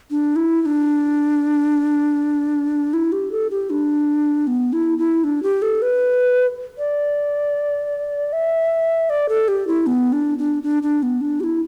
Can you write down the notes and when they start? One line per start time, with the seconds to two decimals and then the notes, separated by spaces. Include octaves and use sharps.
0.11 D4
0.36 E4
0.62 E4
0.66 D4
2.93 E4
3.12 G4
3.32 A4
3.50 G4
3.70 D4
4.47 B3
4.73 E4
4.98 E4
5.24 D4
5.43 G4
5.62 A4
5.82 B4
6.78 D5
8.33 E5
9.10 D5
9.29 A4
9.48 G4
9.67 E4
9.87 B3
10.13 D4
10.38 D4
10.63 D4
10.83 D4
11.03 B3
11.21 D4
11.40 G4
11.44 E4